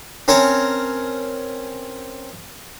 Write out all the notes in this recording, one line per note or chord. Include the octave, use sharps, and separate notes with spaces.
C4 C#4 A#4 C#5 A5 A#5